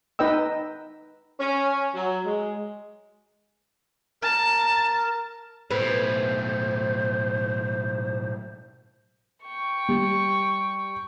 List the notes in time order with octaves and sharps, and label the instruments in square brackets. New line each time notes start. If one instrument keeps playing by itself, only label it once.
[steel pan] D#4 B4 D#5 G5 E6
[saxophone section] C#4
F#3
G#3
[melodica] A#4 [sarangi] A5
[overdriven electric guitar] B1 A2 [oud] B4 [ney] C5
[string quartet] G5 C#6
[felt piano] G3